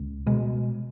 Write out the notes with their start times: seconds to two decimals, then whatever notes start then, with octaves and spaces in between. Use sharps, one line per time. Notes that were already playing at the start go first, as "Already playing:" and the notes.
Already playing: C#2
0.26 B2 G#3